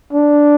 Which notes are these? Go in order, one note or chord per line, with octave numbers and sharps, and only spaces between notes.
D4